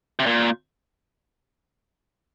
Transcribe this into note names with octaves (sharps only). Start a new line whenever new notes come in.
C3
A#2